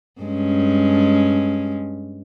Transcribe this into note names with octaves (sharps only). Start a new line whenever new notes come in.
G2 G#3 C#4